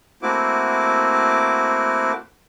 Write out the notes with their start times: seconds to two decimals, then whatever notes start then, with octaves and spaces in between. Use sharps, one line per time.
0.22 A3 A#3 C4 E4 F#4 D6